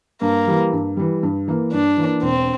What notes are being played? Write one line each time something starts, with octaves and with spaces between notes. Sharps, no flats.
G2 A#3
E3 G3
G2
E3 G3
G2
E3 A#3
G2 D4
E3 A#3
E1 C4